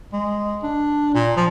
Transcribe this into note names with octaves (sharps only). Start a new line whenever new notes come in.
G#3
D4
A#2
F3